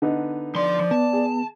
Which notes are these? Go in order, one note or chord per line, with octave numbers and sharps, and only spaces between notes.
D3 B3 D#4
F3 D5 C6
F3
B3 A5
G#4